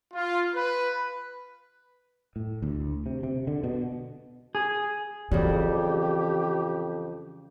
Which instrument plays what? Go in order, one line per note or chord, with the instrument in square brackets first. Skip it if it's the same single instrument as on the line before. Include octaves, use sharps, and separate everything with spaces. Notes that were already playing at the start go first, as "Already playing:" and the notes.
[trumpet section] F4
B4
[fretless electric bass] A2
D2
C3
C3
D3
B2
[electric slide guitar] G#4
[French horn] F2 [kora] C#3 F#3 G3 [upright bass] E3 [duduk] G4